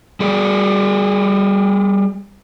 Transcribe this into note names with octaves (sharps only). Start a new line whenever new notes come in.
G3 G#4 D5